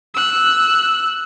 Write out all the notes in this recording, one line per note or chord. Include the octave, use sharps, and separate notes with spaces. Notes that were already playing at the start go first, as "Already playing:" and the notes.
E6 F#6